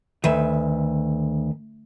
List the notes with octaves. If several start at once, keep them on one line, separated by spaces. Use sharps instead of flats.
D2 D#3 B4 E5